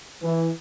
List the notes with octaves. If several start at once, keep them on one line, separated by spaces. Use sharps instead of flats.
E3